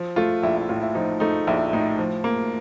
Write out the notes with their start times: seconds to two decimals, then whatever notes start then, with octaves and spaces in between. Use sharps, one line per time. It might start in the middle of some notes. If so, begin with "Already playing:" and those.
Already playing: F3
0.16 A3 F4
0.43 A#1 E4
0.56 E4
0.69 A2 F4
0.82 E4
0.95 F3 D#4
1.20 A3 D#4
1.47 A#1 E4
1.73 A2 D#4
1.99 F3
2.24 A#3